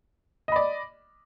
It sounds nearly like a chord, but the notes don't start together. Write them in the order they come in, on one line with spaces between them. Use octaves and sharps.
D#5 B5 D5